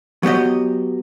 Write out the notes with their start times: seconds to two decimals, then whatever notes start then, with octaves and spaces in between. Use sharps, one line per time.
0.23 F#3 B3 G4 D#5